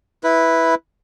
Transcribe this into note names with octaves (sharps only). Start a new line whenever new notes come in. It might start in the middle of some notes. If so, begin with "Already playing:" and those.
E4 B4